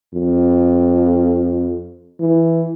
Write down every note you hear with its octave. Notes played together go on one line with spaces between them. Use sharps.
F2
E3